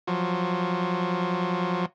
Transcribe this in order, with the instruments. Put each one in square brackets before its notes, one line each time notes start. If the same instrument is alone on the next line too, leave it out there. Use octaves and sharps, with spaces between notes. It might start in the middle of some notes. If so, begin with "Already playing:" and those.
[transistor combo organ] F3 F#3